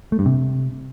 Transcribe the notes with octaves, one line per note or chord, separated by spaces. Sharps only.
A3
G2
C3